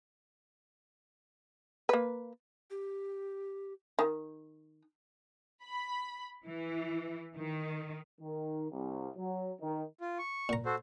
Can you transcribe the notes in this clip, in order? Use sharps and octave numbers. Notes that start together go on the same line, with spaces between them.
A#3 B4
G4
D#3
B5
E3
D#3
D#3
C2
F#3
D#3
F4
C#6
A#2 A#5
F#4 A4 C5